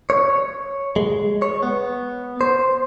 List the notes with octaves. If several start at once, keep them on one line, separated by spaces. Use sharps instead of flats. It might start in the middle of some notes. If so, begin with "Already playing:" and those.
C#5
G#3
C#5
B3
C5